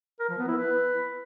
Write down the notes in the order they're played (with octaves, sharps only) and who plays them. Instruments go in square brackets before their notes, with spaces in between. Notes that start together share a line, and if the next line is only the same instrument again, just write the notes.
[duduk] A#4
F3
B3
E4
B4